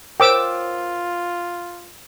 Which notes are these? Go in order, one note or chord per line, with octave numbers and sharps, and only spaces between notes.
F4 A#4 C5 C#5 G5 D6 E6